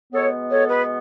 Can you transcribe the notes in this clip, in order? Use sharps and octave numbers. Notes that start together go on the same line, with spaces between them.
B2 G#3 B3 A4 C#5
A4 C#5
G#4 B4